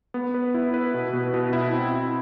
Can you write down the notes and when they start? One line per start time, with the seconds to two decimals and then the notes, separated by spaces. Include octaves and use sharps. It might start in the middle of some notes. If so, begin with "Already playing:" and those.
0.14 B3
0.34 B4
0.54 E4
0.74 B4
0.94 B2
1.13 B2
1.34 B2
1.53 E4
1.73 C4
1.93 E4